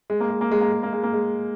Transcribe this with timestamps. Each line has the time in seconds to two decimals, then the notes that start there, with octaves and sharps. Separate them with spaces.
0.10 G#3
0.20 A#3
0.30 G#3
0.41 A#3
0.52 G#3
0.61 A#3
0.72 G#3
0.83 A#3
0.93 G#3
1.03 A#3
1.13 G#3